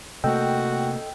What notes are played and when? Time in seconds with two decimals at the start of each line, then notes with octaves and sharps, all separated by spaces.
0.24 C3 A3 A#3 F#4 A4 D#5 G5 E6